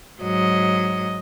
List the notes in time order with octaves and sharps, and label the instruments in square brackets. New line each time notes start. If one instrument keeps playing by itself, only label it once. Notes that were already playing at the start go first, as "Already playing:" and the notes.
[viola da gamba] G#2 F#3 D#5